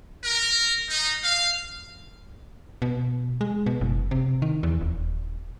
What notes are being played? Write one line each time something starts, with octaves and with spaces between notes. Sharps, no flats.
A#4
D#4
F5
B2
G#3
B2
F#1
C3
D#3
E2
D#1